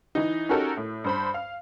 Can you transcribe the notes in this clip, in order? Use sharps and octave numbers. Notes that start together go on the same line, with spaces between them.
E3 D#4
C#4 D#4 F#4 G4 A4 A#4
A2
G2 C5 B5
F5